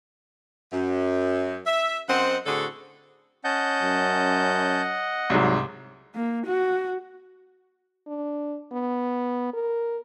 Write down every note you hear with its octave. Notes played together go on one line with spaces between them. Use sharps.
F#2
E5
F#2 C4 C5 D#5 F#5
A2 D3 C4 F#4 G#4 A4
C#4 D#5 F#5 A5 G6
F#2
C2 G#2 F#3
A#3
F#4
D4
B3
A#4